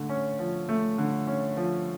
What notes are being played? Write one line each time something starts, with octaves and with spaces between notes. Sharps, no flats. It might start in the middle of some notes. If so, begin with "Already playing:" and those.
Already playing: D3 A3
C#4
F3
A3
D3
C#4
F3